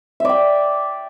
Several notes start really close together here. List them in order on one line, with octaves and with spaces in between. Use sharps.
E5 D5 G5